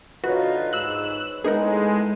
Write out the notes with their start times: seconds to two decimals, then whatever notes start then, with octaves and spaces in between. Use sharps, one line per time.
0.24 D3 D#4 F4 F#4 B4 C#5
0.73 G#2 E6 F#6
1.44 A2 G#3 B3 D#4 G#4 A#4